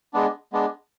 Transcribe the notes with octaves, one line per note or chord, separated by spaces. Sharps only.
G#3 B3 D4
G#3 B3 D4